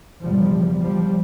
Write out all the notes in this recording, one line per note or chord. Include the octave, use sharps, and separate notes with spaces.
F#1 E2 B2 F3 G3
F3 G3